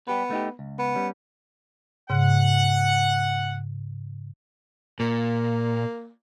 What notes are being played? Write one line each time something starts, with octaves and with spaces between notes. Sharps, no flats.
G3 B3 G4 B4
A3 D#4 G4
C#2
B3
G3 C#4
G#2 C#3 F#5
A#2 A#3